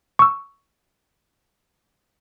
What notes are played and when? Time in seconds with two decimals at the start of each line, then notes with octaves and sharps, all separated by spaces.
0.19 C#6 E6